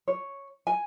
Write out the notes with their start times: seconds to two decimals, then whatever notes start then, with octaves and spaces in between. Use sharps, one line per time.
0.08 C#5
0.67 G#5